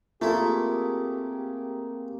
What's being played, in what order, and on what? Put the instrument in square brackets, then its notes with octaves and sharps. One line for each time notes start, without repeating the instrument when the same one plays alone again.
[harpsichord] A3 E4 [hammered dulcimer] A#3 C4 G#4 [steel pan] F4 [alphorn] G4